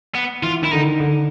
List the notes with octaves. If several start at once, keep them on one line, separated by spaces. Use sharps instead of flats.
B3
E3 F4
D#3 E4
D3 D#4
D#3
D3